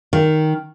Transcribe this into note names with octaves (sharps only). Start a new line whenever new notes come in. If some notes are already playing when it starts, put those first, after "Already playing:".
D#3